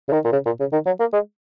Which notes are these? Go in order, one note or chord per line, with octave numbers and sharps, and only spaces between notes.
C#3
D#3
A#2
C#3
A#2
C#3
D#3
F#3
A#3
G#3